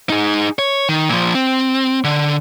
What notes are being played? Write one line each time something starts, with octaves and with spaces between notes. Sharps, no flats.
D#4 G#4
C#5
D#3
A#2 F3
C4
D3